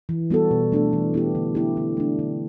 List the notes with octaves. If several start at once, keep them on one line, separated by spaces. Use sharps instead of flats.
E3
G3 B3 F#4 A4
B2
A3 D4 A4
E3
B3 E4 G4
D3
F#3 B3 E4 G4
D3
A3 D4
D3